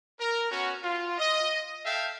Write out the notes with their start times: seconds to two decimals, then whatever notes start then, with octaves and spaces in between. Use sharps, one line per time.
0.19 A#4
0.49 B3 C#4 F#4
0.82 F4
1.18 D#5
1.84 A4 E5 F5 G5